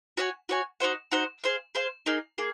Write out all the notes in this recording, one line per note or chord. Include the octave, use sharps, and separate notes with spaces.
F#4 C#5 G#5
F#4 C#5 G#5
D#4 F#4 C5 F#5
D#4 F#4 C5 F#5
G#4 C5 F5
G#4 C5 F5
A#3 D#4 G#4
A#3 G#4